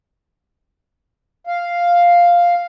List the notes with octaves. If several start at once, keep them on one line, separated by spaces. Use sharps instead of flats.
F5